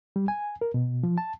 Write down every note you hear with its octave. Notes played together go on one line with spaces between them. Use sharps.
G3
G#5
A#4
B2
F3
A5